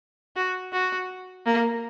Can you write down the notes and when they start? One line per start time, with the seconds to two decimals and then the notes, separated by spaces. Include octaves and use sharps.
0.36 F#4
0.73 F#4
1.46 A#3